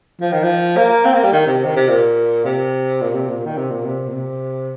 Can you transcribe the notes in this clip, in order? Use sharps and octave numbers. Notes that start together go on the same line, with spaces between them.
F3
D#3
F3
A#3
C4
A#3
G3
D#3
C3
D#3
C3
A#2
C3
A#2
C3
A#2
D#3
C3
A#2
C3
A#2
C3